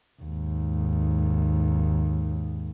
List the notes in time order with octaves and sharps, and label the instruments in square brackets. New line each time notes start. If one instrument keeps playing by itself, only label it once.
[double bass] D#2 G#2